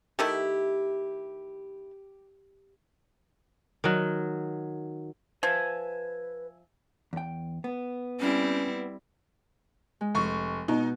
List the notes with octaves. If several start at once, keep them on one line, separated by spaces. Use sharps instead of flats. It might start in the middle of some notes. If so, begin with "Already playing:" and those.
D#3 A3 E4 G4
D#3 F#3
F3 B4 E5 G#5
E2 G5
B3
G3 C4 C#4 E4
G#3
F1 C#6
B2 D#4